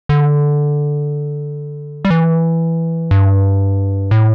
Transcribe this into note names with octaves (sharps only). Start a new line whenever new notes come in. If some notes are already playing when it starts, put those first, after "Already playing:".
D3
G3
E3
G2
A2